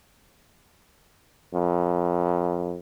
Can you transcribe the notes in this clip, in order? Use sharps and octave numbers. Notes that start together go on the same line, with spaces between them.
F2